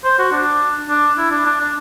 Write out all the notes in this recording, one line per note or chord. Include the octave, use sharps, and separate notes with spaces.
C5
F#4
D4
D4
E4
D4
D4
D4